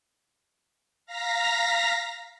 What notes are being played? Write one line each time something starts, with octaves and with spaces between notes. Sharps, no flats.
F5 A#5 A#6 B6